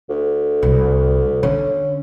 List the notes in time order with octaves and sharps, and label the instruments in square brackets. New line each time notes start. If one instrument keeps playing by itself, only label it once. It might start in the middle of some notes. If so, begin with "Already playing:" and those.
[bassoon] D2
[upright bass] C2
[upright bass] D3 [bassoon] C#4